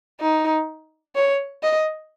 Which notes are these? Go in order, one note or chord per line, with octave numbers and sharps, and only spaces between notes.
D#4
C#5
D#5